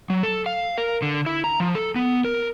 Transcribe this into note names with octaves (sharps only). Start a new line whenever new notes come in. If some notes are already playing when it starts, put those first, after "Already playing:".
F#3
A4
F5
A#4
D3
E4
A#5
F3
A4
B3
A#4